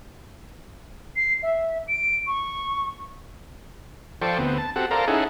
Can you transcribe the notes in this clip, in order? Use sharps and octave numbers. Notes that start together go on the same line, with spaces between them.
C7
E5
D7
C#6
F3 A4 C5 D5 G5 C#6
D2 B3 C4
A5
C4 F#4 G4 A4 F#5
A4 A#4 C5 D5 F5 A#5
C#4 D#4 E4 G#4 A4 F#5